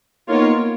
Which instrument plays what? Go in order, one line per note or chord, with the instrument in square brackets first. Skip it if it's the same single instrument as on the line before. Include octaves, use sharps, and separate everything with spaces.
[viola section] A#3 F4 A#4 C#5 [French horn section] B3 D#4